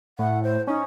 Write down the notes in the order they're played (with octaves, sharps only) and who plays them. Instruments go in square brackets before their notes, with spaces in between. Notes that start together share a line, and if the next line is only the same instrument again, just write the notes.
[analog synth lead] A2 [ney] F#5
[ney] C5
[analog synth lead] C#4 [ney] D#4